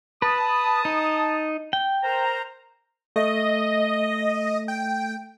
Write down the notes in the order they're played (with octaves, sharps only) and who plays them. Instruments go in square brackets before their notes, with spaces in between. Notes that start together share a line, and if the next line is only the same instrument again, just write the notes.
[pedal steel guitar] B4 [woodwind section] A5 D#6
[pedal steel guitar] D#4
G5
[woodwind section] A#4 C5 A#5
[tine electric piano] A3 [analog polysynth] D#5
[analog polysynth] G5